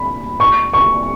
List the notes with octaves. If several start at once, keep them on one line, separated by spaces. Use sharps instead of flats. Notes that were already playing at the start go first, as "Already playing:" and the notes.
Already playing: B5
C#6
C#6